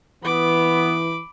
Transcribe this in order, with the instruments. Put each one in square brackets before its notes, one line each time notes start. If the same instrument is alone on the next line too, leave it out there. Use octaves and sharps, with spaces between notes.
[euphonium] E3 [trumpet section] B3 [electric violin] B5 D6